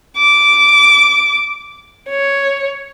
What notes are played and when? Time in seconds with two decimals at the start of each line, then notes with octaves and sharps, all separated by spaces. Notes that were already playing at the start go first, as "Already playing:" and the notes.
0.17 D6
2.09 C#5